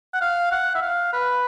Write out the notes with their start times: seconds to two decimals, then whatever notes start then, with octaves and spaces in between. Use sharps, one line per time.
0.14 F#5
0.22 F5
0.52 F#5
0.75 E5
0.82 F5
1.13 B4